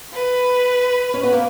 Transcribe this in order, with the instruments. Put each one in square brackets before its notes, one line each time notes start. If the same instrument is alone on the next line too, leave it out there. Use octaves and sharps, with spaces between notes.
[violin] B4
[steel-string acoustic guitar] C#4
B3
A#3